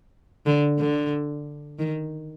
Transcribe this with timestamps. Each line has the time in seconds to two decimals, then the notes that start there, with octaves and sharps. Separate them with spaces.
0.46 D3
0.79 D3
1.79 D#3